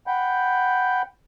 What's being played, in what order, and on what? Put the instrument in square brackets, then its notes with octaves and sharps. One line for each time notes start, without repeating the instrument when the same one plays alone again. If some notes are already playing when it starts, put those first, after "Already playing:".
[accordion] F#5 G5 B5 G6